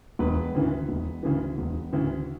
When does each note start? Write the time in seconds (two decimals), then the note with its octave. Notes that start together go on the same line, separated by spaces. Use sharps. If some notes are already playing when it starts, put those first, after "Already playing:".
0.19 E1 B4
0.55 D2 C#3 E3
0.89 E1
1.23 D2 C#3 E3
1.58 E1
1.93 D2 C#3 E3